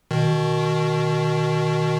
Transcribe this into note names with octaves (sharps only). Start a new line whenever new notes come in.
B2 D#3